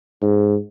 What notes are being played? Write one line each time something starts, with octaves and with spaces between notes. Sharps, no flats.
G#2